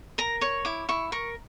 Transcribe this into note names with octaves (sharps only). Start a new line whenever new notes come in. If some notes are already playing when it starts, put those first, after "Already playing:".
A#4 A#5
C#5 C#6
E4 D6
E4 C#6
A#4 C#6